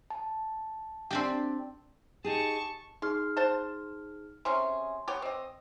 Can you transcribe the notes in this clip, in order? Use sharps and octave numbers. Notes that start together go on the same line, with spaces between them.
A5
C4 D4 G4
D#4 G4 G#4 A5 C#6
D#4 G#4 C6 F6
C5 F#5 A5
C3 C#4 G#4 C6
B3 G4 C#5
C4 D#5